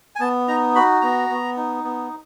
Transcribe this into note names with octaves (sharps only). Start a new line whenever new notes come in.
G#5
B3 A5
D#4 A#5
F#4 B5
B3 A#5
B3
D#4
B3